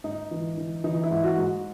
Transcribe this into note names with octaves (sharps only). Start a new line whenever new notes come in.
G#2 D#4
E3
E3
E3 D#4
E4
G#2
F#4
G#2